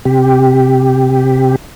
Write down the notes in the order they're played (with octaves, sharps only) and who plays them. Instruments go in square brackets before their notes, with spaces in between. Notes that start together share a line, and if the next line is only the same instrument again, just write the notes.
[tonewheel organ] C3 G4